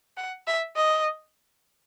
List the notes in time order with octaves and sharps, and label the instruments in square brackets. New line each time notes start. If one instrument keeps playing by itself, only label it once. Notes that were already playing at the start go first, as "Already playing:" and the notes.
[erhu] F#5
E5
D#5